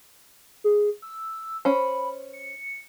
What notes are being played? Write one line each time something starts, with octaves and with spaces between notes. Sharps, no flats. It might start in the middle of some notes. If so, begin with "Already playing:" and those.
G#4
E6
C#4 C5 B5
C#7